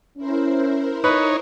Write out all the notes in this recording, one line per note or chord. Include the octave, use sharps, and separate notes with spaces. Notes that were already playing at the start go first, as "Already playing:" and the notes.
C#4 E4 A#4 C5
D#4 B4 C#5